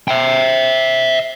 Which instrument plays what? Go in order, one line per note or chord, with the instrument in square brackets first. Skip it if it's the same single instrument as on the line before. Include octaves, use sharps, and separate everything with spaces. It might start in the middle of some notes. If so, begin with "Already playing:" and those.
[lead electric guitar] E5 G5